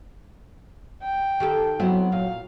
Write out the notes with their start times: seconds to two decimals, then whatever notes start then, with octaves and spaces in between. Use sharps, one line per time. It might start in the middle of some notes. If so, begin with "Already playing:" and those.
1.03 G5
1.40 D#3 G4 A4
1.80 F#3 B3 C4 E4
2.12 A#2 F5